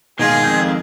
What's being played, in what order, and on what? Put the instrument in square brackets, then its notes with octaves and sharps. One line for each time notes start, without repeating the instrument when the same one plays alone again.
[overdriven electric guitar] B2 F4 [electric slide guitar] D#3 G#3 [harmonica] G#4 [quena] G#6
[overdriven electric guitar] F2 C4